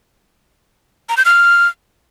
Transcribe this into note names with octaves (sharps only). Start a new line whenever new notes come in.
A#5
G6
F6